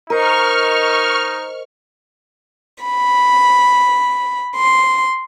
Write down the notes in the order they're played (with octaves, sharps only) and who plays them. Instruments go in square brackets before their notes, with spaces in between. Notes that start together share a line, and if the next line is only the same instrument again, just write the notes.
[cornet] D#4 [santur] A#4 [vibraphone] C5 D#5 [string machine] C#6 F6
[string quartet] B5
C6